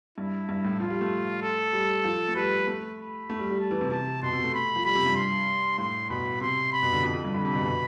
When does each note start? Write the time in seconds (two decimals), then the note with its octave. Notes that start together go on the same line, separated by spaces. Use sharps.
0.18 G2 E4
0.49 G2
0.65 A2
0.80 F3 F4
0.90 G3
1.01 A3
1.42 A4
1.73 G3
2.04 F3
2.28 A3
2.36 G3 B4
2.67 A3
2.98 B5
3.30 A3
3.39 G3
3.50 G3
3.60 A5
3.71 E3
3.81 C3
3.91 C3 A5
4.23 B2 C6
4.33 C3
4.44 A3
4.54 B5
4.76 F3
4.85 G3 B5
4.95 C3
5.06 G2
5.16 C6
5.78 A2 C6
6.10 B2 B5
6.41 C3 C6
6.72 B5
6.83 B2
6.93 D3
7.03 F2
7.13 F2
7.25 G2
7.34 D3 B5
7.45 C3
7.55 B2
7.66 B2